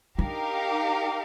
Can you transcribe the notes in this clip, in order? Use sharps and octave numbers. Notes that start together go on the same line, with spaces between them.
D4 D#4 G4 A#4 F5